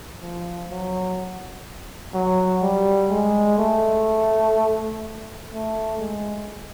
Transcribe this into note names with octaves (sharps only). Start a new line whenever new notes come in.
F3
F#3
F#3
G3
G#3
A3
A3
G#3